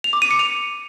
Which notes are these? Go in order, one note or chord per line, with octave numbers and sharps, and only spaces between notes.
F7
D6
D#7
C#7
F7